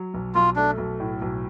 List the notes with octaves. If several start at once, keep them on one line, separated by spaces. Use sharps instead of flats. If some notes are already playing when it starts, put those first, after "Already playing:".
Already playing: F#3
B1
B1 F4
A3 D4
B1
A2
B1